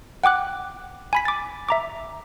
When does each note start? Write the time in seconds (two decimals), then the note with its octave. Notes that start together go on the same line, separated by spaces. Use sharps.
0.24 F#5 G5 D6 F#6
1.13 G#5 B5 B6
1.25 D6 A6
1.69 E5 A#5 D6